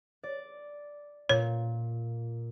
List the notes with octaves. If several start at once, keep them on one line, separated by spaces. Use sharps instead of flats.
D5
A#2 C#5